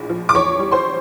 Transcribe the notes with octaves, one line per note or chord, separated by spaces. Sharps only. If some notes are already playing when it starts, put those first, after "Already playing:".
Already playing: A#1 A2 G#3
F3
D6
E2 C#5 C#6
G3
C5 C6